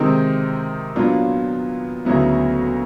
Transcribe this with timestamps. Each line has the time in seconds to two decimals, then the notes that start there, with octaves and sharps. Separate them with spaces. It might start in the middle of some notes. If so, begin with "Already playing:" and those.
Already playing: C3 D#3 G#3 C4 D#4
0.96 A#2 F#3 B3 D4 F4
2.05 D2 C#3 F#3 B3 E4